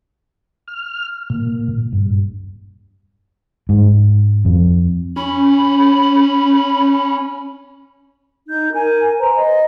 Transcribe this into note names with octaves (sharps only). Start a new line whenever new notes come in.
F6
A#2
G2
G#2
F2
C#4 B5
D#4 G6
A#4 G#5
B4 C5 A#5
D#5